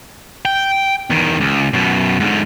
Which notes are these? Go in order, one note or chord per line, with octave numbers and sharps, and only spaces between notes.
G5
E2 D#3
C#2
F#2 B2
G#2 D3